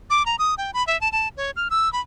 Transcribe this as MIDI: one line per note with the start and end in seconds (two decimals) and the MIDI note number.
0.10 0.25 86
0.26 0.36 82
0.39 0.54 87
0.58 0.71 79
0.74 0.85 83
0.87 0.99 76
1.01 1.11 81
1.12 1.28 81
1.37 1.51 73
1.56 1.68 89
1.70 1.92 88
1.93 2.00 83